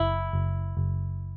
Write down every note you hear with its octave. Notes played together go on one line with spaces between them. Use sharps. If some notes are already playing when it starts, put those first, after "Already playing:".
Already playing: F#1 E4
F#1
F#1